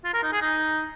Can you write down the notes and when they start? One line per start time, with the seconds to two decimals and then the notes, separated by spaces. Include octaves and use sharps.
0.04 F4
0.14 A#4
0.23 D#4
0.32 G#4
0.42 D#4